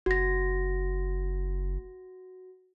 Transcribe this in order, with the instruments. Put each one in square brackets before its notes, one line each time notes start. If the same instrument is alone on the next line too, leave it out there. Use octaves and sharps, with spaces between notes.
[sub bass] F#1 [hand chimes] F#4 A#6